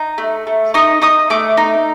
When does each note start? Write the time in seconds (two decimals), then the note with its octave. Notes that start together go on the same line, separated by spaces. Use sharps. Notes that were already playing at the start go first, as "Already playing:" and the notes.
Already playing: D#4
0.18 A3
0.47 A3
0.74 D#4 D#6
1.02 D#4 D#6
1.30 A3 D6
1.57 D#4